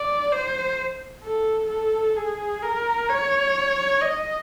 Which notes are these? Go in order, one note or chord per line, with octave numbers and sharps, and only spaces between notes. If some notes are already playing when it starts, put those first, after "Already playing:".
Already playing: D5
C5
A4
A4
G#4
A#4
C#5
D#5